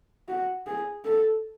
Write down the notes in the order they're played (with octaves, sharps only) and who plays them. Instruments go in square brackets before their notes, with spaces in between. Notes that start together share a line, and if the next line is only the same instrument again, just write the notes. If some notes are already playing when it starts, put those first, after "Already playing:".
[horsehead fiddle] F#4
G#4
A4